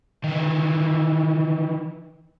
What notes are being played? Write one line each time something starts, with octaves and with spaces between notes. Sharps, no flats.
D#3 E3